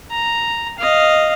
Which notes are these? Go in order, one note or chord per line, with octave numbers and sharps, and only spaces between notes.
A#5
D#5 F5